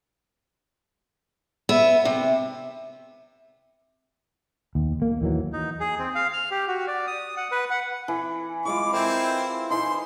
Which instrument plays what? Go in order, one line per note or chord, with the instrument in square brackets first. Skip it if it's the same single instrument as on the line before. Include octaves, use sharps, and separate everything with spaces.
[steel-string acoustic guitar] B3 E5
C3
[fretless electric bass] D#2
A#3
D#2 E3 F#3
[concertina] D#4
G#4
C4
F5
F6
G4
F#4
D5
D#6
F#5
B4
F#5
[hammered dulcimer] E3
[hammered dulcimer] E3 G#3 F4 [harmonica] D6
[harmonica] C4 E4 [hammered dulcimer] A#4 C5
[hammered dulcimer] E3 D#4 [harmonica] C6